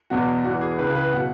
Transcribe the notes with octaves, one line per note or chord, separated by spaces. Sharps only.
E2 B2 F#3 F#4
E2 E3 F#4
G#4
C#2 C#3 E3 B4
G#4
B4
B2 F#3 F#5